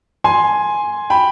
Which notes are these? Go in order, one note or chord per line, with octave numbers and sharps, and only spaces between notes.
G#5 C6
G5 B5